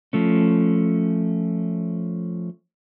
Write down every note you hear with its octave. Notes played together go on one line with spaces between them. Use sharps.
F3 A3 C#4